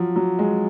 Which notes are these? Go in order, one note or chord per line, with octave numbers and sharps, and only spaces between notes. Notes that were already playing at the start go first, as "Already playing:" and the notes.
Already playing: F3 F#3
F#3
G#3